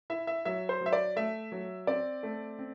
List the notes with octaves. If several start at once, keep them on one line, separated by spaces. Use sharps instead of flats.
E4 E5
E5
F#3 E5
C5
F#3
E5
D5
A3 E5
F#3
C4 D5
A3
C4